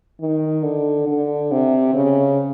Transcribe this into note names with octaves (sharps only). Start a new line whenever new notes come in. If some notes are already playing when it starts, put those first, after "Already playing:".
D#3
D3
D3
C3
C#3